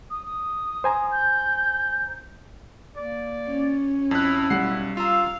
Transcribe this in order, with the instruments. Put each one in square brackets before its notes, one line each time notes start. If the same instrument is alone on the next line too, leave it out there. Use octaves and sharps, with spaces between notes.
[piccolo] D#6
D#6
[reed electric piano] C5 G#5 A#5
[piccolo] G6
[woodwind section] A#3 D5
[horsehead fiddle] C#4
[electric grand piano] F2 F#6 [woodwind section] E4
[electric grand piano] B1 F#5 C7 [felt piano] G3
[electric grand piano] F4 A#5 [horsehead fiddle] F5 [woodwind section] E6